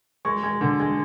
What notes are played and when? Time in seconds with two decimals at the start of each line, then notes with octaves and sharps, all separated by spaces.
0.25 G#3 C#6
0.43 G#3
0.61 D3
0.80 G#3